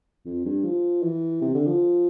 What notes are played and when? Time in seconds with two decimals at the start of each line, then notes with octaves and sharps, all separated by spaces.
0.25 F2
0.45 G2
0.64 F3
1.03 E3
1.42 C3
1.54 D3
1.67 F3